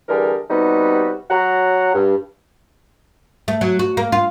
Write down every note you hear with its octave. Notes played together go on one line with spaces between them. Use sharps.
D3 E3 G3 G#4 A#4
C3 G3 B3 D#4 F#4 B4
F#3 F#5 A#5
G2
A3
F#3
F#4
A#3
F4